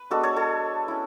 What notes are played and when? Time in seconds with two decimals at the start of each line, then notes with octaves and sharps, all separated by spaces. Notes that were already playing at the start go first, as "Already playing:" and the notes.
Already playing: B4
0.10 G#3 B3 D4 F#4 A4
0.23 A4 C#5
0.36 A4 C#5
0.88 C#4 E4